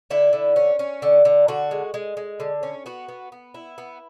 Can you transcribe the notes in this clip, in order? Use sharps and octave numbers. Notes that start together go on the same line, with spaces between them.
D3 E4
D3
C#4
C#4
D3
D3
D3 F#4
G#3
G#3
G#3
D3
C#4
B3 F#4
B3
B3
E4
B3